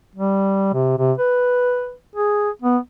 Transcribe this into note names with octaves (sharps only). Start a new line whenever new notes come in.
G3
C3
C3
B4
G#4
B3